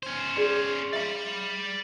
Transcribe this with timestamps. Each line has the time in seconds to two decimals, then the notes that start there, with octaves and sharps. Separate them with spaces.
0.03 C#4 C5
0.36 G#4 D5 C6
0.93 D5 E5 F5 B5 C6